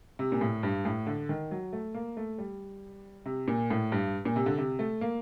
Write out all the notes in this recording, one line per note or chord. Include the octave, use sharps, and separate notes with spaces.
C3
A#2
A2
G2
A2
D3
D#3
F#3
A3
A#3
A3
G3
C3
A#2
A2
G2
A#2
C3
D3
C3
A3
A#3